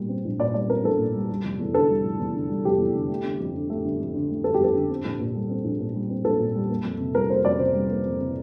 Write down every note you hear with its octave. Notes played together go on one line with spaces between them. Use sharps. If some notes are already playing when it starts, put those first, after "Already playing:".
Already playing: A#2 G3
C4
A#1
A#2 D5
G3 D5
C4 A#4
A#1 A4
A#2
G3
G3
F1
E2
D3 A4
G3
F1
E2
D3
G3
F1 G4
E2
D3
A3
G1
F2
D3
A3
G1
F2
D3
A3
G1 A4
G4
F2 A4
D3
C4
A#1
A#2
G3
C4
A#1
A#2
G3
C4
A#1 A4
A#2
G3
A#3
F2
C3
G3 A#4
A#3 C5
F2 D5
C3 C5
G3
A#3
F2
C3